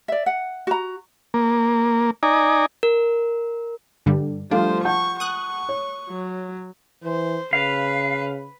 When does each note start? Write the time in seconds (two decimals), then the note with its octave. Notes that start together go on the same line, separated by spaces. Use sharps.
0.08 D5 E5
0.26 F#5
0.67 F#4 A#5
1.34 A#3
2.23 D#4 D5 G#5 A#5
2.83 A#4
4.06 G2 D3 G3
4.51 F3 G3 A3 D4 C5 F5
4.85 F#5 A5 C#6 G6
5.20 C#6 D#6 F#6
5.69 C#5
6.09 F#3
7.04 E3 C5
7.53 C#3 B4 F5